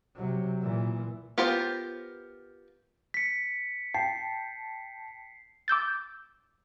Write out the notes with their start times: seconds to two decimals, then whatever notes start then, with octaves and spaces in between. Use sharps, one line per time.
0.16 C3 F#3
0.61 A#2 E3
1.38 B3 F4 G4 A#4 C5
3.14 B6 C#7
3.94 G5 A5 C7
5.68 D6 E6 G6 A6